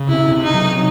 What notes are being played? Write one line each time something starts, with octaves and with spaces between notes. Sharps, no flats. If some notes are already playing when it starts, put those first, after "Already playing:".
Already playing: C#3
C3 E4
C3
D#4
F#3